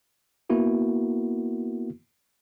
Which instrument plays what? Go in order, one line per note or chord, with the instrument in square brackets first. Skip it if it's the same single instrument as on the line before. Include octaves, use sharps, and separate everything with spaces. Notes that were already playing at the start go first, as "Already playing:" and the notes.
[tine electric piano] A#3 B3 E4 F#4 A#4